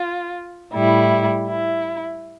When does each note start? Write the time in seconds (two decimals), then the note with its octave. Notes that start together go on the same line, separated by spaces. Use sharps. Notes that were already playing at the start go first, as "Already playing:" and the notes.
Already playing: F4
0.73 A2 G3 E4
1.47 E4